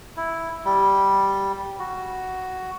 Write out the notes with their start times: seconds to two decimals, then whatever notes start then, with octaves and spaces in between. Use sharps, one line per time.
0.17 E4
0.65 G3
1.79 F#4